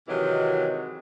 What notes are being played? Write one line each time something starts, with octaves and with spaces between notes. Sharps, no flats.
C3 D#3 E3 F#3 G#3